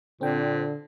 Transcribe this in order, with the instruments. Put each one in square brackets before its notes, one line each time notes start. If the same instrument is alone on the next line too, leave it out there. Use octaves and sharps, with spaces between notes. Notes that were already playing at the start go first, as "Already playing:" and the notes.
[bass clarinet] A#2 [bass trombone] D3 [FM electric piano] C4 G5